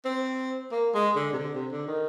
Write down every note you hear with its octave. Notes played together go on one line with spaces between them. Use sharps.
C4
A#3
G#3
D3
C3
D3
C3
D3
D#3